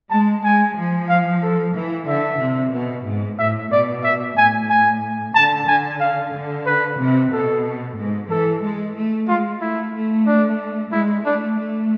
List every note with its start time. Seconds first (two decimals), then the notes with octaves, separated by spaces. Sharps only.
0.11 G#3 A5
0.44 G#3 G#5
0.77 F3
1.09 F5
1.43 A4
1.74 E3
2.08 D3 E5
2.40 C3
2.73 B2
3.06 G#2
3.39 A2 E5
3.72 B2 D5
4.04 E5
4.37 A2 G#5
4.69 G#5
5.35 D3 A5
5.68 D3 G#5
6.00 F5
6.34 D3
6.66 B4
6.99 C3
7.32 B2 A4
7.97 G#2
8.30 E3 A4
8.63 G#3
8.95 A3
9.28 G#3 F4
9.61 A3 E4
9.95 A3
10.27 D4
10.92 G#3 E4
11.25 A3 D4
11.58 A3